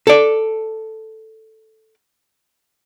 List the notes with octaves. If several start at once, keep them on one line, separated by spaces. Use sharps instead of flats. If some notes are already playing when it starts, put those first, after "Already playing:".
A4 D5